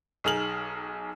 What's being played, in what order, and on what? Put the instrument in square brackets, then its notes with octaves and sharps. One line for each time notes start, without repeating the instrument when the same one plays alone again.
[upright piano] B1 D#4 G#4 F6 F#7